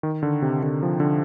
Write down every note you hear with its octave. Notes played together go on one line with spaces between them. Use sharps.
D#3
D3
C3
D3
F3
D3